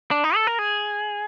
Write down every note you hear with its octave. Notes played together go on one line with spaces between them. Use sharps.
D4
D#4
A4
A#4
G#4